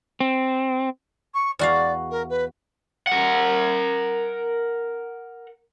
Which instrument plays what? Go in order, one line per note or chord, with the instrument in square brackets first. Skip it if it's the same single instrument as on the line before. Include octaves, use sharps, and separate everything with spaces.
[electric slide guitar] C4
[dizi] C#6
[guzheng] E2 F#4 F5 [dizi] D5
[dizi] A#4
B4
[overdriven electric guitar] A#4 F#5